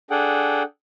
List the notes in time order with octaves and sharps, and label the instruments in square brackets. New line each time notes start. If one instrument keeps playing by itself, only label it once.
[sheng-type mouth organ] D4 G#4 A4 F#5 G5